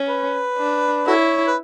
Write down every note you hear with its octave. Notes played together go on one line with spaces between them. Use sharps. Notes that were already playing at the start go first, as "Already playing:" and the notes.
Already playing: C#4
B4
D4
E4 F#4 A4 C#5
B4